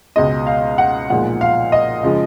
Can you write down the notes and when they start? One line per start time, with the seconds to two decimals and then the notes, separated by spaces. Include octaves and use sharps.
0.16 C#2 B2 G#3 D#5
0.47 F5
0.78 F#5
1.09 B1 A#2 F3 G#3 F#5
1.41 F5
1.72 D#5
2.03 C#3 F3 G#3